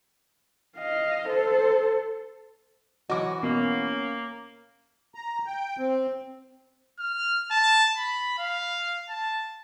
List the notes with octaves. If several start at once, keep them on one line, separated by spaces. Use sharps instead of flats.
D#5 F5
A4 C5
E3 F#3 F#4 D#5 D6
B2 A#3 C#4
A#5
G5
C4
F6
A5
B5
F5
A5